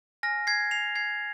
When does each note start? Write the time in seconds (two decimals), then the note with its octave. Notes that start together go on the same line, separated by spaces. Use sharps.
0.23 G#5 F6 A#6
0.47 G#6 C7
0.71 C7 F7
0.95 G#6 C7